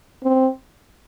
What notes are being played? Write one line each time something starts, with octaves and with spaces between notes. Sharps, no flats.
C4